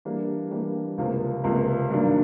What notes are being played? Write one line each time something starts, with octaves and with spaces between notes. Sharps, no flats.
E3 G3 A#3 D4 G4
E3 G3 A#3 D4 G4
C#2 C3 F3 A#3
C#2 C3 F3 A#3
G2 D#3 F#3 A#3 D4